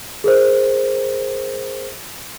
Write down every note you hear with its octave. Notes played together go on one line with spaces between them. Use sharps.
G#4 A#4 C5